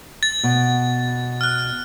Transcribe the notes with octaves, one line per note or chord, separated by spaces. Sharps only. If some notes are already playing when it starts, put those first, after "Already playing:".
A6
B2
F6 F#6